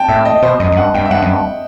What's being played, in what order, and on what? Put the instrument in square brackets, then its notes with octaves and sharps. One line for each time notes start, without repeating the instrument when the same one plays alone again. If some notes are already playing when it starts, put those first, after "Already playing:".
Already playing: [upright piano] G5 A5
[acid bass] A2 [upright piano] E5
[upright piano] D#5
[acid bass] B2 [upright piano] C5
[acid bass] F#2 [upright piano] D#5
[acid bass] F#2
[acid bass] G2 [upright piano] F#5
[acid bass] G2 [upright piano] G5
[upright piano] E5
[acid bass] G2 [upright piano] F#5
[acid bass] F#2
G2